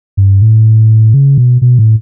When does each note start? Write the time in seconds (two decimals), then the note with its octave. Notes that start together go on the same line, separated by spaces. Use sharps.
0.17 G2
0.42 A2
1.14 C#3
1.38 B2
1.62 B2
1.79 A2